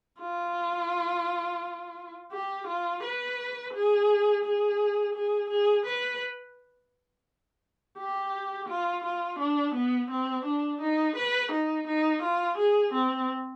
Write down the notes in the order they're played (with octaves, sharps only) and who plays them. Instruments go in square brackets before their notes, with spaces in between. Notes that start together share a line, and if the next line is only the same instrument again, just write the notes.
[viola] F4
G4
F4
B4
G#4
G#4
G#4
G#4
B4
G4
F4
F4
D4
B3
C4
D4
D#4
B4
D#4
D#4
F4
G#4
C4